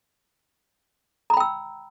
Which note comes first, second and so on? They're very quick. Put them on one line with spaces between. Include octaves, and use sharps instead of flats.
A#5 B5 G5 E6